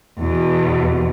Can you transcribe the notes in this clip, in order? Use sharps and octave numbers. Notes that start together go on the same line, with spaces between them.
E2 B2